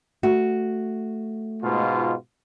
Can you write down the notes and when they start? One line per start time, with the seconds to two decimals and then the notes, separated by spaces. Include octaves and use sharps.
0.23 A3 F#4
1.63 G#2 B2 F4